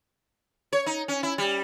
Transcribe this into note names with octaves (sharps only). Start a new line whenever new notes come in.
C#5
D#4
C#4
E4
G3